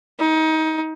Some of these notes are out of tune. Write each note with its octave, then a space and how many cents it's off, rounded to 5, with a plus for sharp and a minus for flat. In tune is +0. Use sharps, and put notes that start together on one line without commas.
D#4 +25